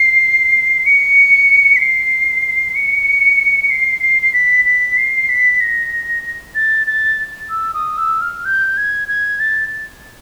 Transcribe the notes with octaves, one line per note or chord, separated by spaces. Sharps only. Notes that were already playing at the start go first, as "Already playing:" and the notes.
Already playing: C7
C#7
B6
C7
C#7
C7
C7
C7
B6
B6
C7
B6
A#6
A6
A6
E6
D#6
E6
F6
G6
G#6
G#6
A6